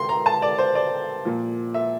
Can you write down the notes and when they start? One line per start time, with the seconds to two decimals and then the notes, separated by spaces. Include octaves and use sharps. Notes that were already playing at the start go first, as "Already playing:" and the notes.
Already playing: C3 C6
0.09 A#5
0.26 A5
0.42 D5
0.58 C5
0.75 D5
1.25 A#2 F3
1.74 E5